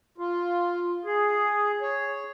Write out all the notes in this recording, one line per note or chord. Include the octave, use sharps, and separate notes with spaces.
F4
G#4
C#5